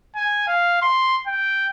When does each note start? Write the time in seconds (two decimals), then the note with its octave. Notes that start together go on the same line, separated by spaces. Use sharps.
0.16 G#5
0.48 F5
0.82 C6
1.27 G5